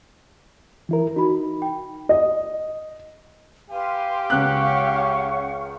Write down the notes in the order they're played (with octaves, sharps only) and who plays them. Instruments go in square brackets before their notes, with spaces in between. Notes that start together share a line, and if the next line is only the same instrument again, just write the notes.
[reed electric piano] E3 E4 A#4
[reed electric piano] D#4 [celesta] F#4 B5
[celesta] G5
[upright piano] D#5
[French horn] G4 [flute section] B4 G#5 C6 [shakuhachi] F5
[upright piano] C#2 F#6 [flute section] C#4 F#5 C#6